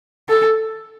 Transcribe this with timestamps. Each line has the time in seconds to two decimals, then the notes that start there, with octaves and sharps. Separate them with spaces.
0.29 A4